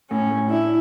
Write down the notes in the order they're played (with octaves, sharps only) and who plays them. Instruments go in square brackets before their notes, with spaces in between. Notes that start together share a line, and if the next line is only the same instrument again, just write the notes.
[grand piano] A2 [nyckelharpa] C#4
[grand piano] A2
[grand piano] D4 [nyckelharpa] E4